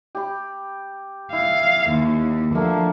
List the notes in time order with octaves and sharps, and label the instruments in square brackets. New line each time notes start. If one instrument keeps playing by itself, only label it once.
[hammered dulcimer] G4 B5
[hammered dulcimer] E4 [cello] F5
[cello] D#2 [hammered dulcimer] C6
[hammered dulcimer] D3 A3 A#3 [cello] F3